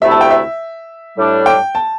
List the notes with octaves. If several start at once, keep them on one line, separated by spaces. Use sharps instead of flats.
D2 C3 A3 E4 E5
A5
G5
E5
A2 G3 D4
G5
A5